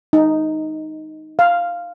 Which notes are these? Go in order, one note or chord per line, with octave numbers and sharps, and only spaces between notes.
D#4
F5